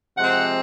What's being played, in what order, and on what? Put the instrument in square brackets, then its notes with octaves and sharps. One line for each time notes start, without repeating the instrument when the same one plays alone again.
[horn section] C3 F3 G#3 C4 F#5